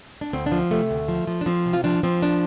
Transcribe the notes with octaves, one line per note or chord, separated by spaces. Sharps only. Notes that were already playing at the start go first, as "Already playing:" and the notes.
D4
D2 C4
D4
F3
C4
C3 A3
D2
F3
F3
D4
F3 C4
C3
F4
F3 D4
F3 C4
D4